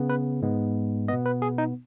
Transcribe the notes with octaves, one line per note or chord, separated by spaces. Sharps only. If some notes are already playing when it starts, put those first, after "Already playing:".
Already playing: C#3 B3
B4
G#2 G#3 B3
B2 B3 D#5
B4
G#4
D#4